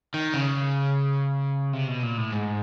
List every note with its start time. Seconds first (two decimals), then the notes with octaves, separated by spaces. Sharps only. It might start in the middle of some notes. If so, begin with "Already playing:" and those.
0.14 D#3
0.34 C#3
1.73 C3
1.88 B2
2.03 A#2
2.18 A2
2.32 G#2